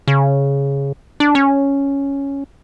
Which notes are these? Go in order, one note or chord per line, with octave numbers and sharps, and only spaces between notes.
C#3
D4
C#4